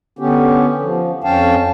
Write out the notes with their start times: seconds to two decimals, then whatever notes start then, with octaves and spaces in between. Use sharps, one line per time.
0.19 D3 B3 C#4 G4
0.81 F3
1.24 F2 C#4 F5 G5 A5